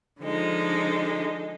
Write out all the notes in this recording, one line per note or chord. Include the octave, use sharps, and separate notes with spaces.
D3 F3 G#3 D#4